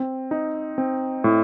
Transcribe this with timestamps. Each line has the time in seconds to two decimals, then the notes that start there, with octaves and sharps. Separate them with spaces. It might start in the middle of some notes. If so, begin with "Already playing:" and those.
Already playing: C4
0.31 D#4
0.78 C4
1.24 A2